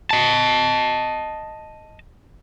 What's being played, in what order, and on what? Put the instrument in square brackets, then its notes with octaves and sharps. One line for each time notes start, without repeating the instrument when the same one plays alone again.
[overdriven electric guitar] D#5 A5